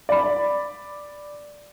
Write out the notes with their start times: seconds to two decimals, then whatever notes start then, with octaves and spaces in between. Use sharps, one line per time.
0.09 D5 B5